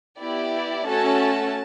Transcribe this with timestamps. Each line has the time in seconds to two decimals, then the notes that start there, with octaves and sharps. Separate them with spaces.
0.19 B3 E4 G4 D5
0.84 A3 C#4 F#4 A4 A5